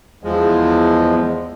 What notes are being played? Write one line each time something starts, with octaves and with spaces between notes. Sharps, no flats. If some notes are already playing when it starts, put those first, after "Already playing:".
E2 F3 G#3